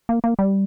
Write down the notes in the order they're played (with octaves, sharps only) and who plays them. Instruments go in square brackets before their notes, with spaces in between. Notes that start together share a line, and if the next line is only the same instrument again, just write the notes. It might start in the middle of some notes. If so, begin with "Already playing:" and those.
[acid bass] A#3
A#3
G3